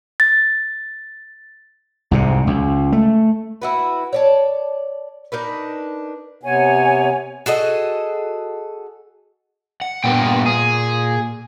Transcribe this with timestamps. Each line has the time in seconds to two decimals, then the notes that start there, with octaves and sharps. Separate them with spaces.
0.20 A6
2.11 C2 G#2 C3
2.47 C#2
2.92 A3
3.62 E4 F#4 B4
4.13 C#5 D5 A5
5.32 D4 D#4 A#4 B4
6.43 C3 B3 C#5 G#5
7.46 F#4 G#4 A4 D#5
9.81 F#5
10.04 G2 A#2 B3 G5
10.46 G#4